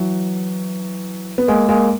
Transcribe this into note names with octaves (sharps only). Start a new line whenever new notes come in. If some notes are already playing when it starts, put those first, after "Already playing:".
Already playing: E3 F#3
B3
G#3 A#3
G#3 A#3